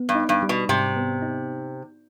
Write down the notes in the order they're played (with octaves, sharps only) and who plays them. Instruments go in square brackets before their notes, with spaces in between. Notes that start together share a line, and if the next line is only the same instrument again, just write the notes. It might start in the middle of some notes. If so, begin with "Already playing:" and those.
Already playing: [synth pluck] B3
[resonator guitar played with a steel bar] G2
[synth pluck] D#4
[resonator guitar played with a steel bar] G2
[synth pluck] G3
[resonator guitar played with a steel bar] B2
[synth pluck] G#2 [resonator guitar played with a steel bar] C3
[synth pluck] B3
D#4